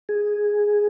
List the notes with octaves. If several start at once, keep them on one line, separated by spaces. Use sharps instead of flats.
G#4